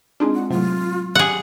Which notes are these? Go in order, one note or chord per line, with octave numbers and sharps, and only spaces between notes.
G#3 C4 D4 D#4 F4 G#4
F#5
A2 C3 F#3 F4
G4 G#4 F#5